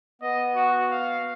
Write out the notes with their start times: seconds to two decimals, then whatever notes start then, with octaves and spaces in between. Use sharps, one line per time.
0.22 B3 D#5
0.56 F#4
0.91 F5